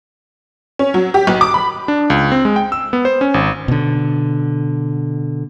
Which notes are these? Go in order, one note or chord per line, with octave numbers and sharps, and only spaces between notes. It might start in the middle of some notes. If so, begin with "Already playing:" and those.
C#4
F#3
G4
B1
D6
B5
D4
C#2
C4
G#3
G5
E6
B3
C5
C#4
G#1
B2 D3